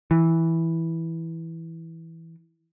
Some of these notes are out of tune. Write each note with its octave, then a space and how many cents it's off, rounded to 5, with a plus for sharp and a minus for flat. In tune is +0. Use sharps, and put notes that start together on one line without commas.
E3 -5